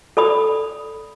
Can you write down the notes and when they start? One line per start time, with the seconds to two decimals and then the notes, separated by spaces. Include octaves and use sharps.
0.17 A4 D5 B5 D#6